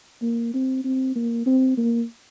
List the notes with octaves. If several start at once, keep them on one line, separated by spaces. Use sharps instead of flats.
A#3
C4
C4
A#3
C4
A#3